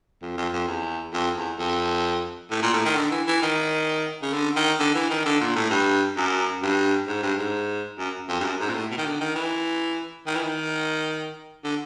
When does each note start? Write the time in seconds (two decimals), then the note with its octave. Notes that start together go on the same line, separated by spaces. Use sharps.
0.22 F2
0.37 F2
0.53 F2
0.67 E2
1.13 F2
1.36 E2
1.59 F2
2.51 A2
2.62 A#2
2.73 A2
2.85 D#3
2.96 D3
3.11 E3
3.27 E3
3.42 D#3
4.22 C#3
4.33 D3
4.56 D#3
4.79 D3
4.94 E3
5.10 D#3
5.25 D3
5.40 A#2
5.55 A2
5.70 G2
6.16 F#2
6.62 G2
7.07 G#2
7.22 G2
7.38 G#2
7.99 F#2
8.28 F2
8.40 G2
8.44 F#2
8.60 G#2
8.69 A#2
8.74 A2
8.90 B2
8.97 D#3
9.05 D3
9.20 D#3
9.35 E3
10.26 D#3
10.35 E3
10.43 D#3
11.64 D3